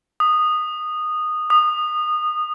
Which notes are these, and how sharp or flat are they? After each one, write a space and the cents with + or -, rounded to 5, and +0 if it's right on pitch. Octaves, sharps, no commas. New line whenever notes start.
D#6 -15
D#6 -25